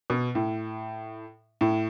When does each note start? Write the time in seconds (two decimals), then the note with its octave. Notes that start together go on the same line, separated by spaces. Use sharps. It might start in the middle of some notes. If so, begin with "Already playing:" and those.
0.10 B2
0.35 A2
1.61 A2